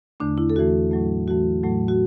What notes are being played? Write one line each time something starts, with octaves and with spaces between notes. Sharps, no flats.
E2 D3 A3 D4
E4
A4
E2 E3 A3 F#4
A2 F#3 A3
E2 E3 A3 F#4
A2 F#3 A3
F#4